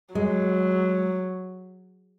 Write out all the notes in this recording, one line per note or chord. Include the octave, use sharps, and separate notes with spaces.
F#3 G#3